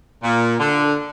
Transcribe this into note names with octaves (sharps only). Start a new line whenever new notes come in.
A#2
D3